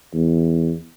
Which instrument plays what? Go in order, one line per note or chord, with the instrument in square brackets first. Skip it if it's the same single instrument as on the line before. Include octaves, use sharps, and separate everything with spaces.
[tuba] E2